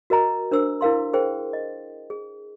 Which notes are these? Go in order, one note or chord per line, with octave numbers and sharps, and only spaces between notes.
F#4 A#4 D#5 A#5
D4 A#4 C5 E6
E4 A#4 F5 C6
G#4 A#4 C5 G5
D#5
G#4